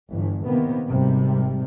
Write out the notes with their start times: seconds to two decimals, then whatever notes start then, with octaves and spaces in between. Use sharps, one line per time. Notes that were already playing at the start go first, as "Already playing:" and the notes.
0.11 G1 E3
0.45 C3 D#3 A#3 B3
0.86 G#1 C3 G3